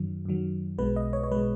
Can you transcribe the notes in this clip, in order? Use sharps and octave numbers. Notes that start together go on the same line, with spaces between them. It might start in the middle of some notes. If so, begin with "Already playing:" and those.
Already playing: F#2 D#3 F#3
F#2 D#3 F#3
B1 B2 G#3 B4
D#5
C#5
C#5
B2 G#3 B4